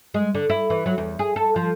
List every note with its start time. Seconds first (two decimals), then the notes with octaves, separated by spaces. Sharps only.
0.14 G#3
0.35 D3
0.50 E4
0.70 E3
0.86 F#3
0.98 E2
1.19 G#4
1.36 A4
1.56 F3